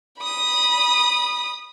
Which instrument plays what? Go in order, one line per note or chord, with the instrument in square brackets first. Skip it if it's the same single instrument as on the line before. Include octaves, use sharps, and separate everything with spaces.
[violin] B5 D#6